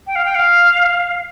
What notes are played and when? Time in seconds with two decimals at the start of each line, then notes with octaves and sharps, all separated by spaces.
0.07 G5
0.16 F5
0.25 G5
0.35 F5